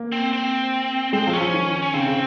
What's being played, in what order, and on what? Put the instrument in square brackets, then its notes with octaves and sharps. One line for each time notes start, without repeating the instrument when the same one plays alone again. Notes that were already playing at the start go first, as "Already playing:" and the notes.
Already playing: [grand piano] A#3
[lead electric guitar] C4
C4
[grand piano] G#3 [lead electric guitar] C4
[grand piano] F3
[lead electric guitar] C#4
[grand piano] F3
D#3
[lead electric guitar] C#4
[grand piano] C#3 [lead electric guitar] C4
[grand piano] C#3